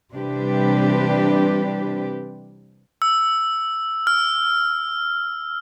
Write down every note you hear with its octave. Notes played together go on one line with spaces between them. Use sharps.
C3 E3 G3 D4 G4 B4
E6
F6